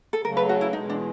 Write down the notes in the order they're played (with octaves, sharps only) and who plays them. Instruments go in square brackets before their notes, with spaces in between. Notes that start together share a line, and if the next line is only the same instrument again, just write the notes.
[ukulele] A4
[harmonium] C#3 F#3 A3 [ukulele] A#4
[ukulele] B4
F#4
E4
[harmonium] E2 B2 G#3 [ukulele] D#4
[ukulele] D4